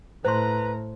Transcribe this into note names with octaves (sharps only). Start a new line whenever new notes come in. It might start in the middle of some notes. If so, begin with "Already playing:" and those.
A2 B4 C5 A#5 C6